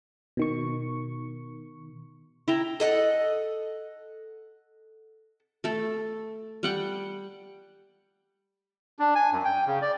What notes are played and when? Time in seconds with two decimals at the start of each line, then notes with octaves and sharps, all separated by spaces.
0.37 B2 D#3 C#6
2.48 E4 G5 A#5
2.80 A4 D#5 F#5
5.64 A3 A4
6.63 G3 F#5 G5
8.99 D4
9.15 G#5
9.32 F#2
9.45 G5
9.67 C#3
9.82 D5